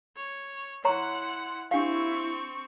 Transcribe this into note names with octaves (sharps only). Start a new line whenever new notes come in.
C#5
E4 C#5 F#5 A#5 C6 C#6
C4 D4 E4 G4 F5 C#6